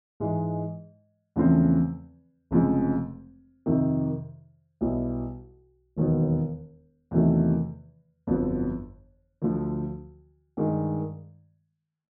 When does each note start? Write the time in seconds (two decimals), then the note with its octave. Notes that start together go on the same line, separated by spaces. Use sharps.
0.20 G#2 E3 G#3
1.36 E2 C#3 F3 A3 C4
2.51 F1 F2 C#3 F3 G#3
3.66 F2 C3 D#3
4.81 B1 B2 G3 B3 E4
5.97 E1 D#2 D#3 F#3 B3
7.11 E2 C3 D#3 F#3 A3
8.27 G1 F2 D3 F#3 B3
9.42 D2 D3 F3
10.57 G2 D#3 G#3